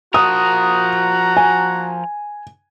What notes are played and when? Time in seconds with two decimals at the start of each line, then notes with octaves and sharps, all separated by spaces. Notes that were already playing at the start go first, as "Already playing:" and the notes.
0.14 F3 F#4 A#4 A#5 D#6
1.37 G#5